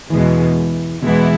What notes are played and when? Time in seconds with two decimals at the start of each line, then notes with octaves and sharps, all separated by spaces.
0.10 E2 B2 E3 G#3
1.02 E2 B2 E3 G#3 B3 E4